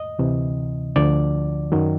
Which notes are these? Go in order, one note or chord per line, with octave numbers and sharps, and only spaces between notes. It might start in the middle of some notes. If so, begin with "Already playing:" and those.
Already playing: D#5
D2 C3 E3
D2 D3 F3 D5
F#2 D#3 F#3